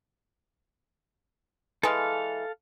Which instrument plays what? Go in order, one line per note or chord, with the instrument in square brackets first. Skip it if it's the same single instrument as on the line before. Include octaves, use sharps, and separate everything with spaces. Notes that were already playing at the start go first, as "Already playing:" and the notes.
[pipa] E3 G#3 [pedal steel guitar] A4 F5